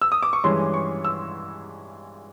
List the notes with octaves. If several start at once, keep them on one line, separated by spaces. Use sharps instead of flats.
E6
D#6
D6
C#6
G2 E3 G#3 C#4 C6
C#6
E6